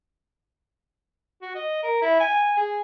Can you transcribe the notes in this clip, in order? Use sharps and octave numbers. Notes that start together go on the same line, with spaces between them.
F#4
D#5
A#4
E4
G#5
G#4